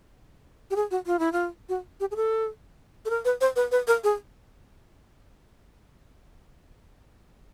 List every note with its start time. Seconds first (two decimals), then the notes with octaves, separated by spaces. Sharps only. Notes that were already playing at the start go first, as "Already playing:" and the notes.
0.70 G4
0.76 G#4
0.91 F#4
1.06 F4
1.19 E4
1.32 F4
1.69 F#4
2.00 G4
2.11 G#4
2.16 A4
3.05 A4
3.10 A#4
3.25 B4
3.41 C5
3.56 B4
3.71 B4
3.87 A#4
4.04 G#4